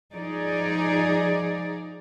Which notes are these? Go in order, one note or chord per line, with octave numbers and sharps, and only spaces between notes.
F3 D#4 G#4 D5